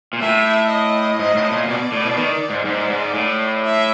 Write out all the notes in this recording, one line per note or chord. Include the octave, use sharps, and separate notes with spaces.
A#2
A2 E5
D#5
G#2 D#5
A2
A#2
B2 D5
A2
B2
D#3
G#2
G#2 D5
G#2
A2
E5